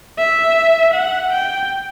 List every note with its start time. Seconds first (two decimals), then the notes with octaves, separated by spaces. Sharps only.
0.18 E5
0.94 F#5
1.32 G5